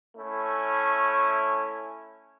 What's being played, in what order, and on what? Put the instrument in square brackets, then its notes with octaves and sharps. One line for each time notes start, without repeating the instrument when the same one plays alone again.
[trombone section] A3 C#4 E4